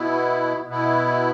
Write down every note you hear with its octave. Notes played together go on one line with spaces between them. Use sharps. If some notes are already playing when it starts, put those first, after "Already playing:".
Already playing: B2 B3 E4
B2 B3 E4